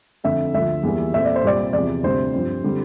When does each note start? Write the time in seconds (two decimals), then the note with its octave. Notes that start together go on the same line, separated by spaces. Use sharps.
0.24 F2 D3 A3 E5
0.53 D2 D3 F3 E5
0.83 E2 E3 G3 A#3
1.13 A#2 A3 C4 E5
1.25 D5
1.36 C5
1.43 C2 A#2 G3 C4 D5
1.73 E2 C3 F3 D5
2.03 D2 C3 G3 C4 C5
2.34 G2 F3 C4
2.64 D3 G3 C4